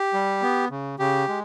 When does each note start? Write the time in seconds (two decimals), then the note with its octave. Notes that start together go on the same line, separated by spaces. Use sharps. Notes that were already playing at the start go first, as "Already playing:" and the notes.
Already playing: G4
0.13 G3
0.42 B3
0.71 C#3
0.99 C#3 G4
1.28 G#3